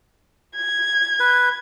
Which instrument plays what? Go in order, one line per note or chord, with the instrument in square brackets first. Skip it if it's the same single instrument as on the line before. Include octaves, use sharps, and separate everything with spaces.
[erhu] G#6
[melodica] B4